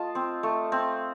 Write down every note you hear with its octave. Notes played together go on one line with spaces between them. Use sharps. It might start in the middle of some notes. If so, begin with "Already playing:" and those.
Already playing: A3 F4 D#5 A5
C4
A3
C4